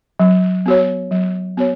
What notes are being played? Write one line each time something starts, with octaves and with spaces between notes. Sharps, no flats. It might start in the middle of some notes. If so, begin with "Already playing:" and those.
F#3
B3 F#4 C#5
F#3
B3 F#4 C#5